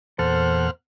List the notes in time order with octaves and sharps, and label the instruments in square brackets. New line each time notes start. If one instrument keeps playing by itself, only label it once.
[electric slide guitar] E2 A4 [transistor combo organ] A#2 F#5 F6 [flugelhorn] C5